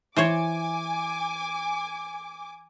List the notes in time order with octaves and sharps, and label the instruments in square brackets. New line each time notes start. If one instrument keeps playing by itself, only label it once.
[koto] E3 C5 C#5 [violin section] G#5 D6